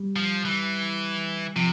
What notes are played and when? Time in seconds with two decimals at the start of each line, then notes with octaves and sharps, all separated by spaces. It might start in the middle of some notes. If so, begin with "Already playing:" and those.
Already playing: G3
0.16 F3
0.45 E3
1.56 C3 F3